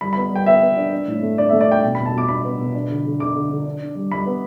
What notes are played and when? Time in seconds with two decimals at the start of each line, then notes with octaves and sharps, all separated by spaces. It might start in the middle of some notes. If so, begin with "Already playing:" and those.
0.01 G3 B5
0.13 B3 B5
0.31 G3 G5
0.46 B3 E5
0.62 B3
0.77 D4
0.91 D4
1.08 A2
1.22 A3
1.38 D4 D5
1.49 A3 E5
1.61 D5
1.67 D4 G5
1.83 B2
1.95 B2 B5
2.06 A5
2.14 B2 D6
2.28 D4 B5
2.44 B3
2.59 B2
2.74 D4
2.89 D3
3.05 D3
3.19 D3 D6
3.35 D3
3.50 D3
3.66 D4
3.80 D4
3.95 G3
4.11 G3 B5
4.26 B3